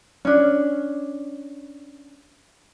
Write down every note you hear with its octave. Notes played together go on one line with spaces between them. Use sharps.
C#4 D4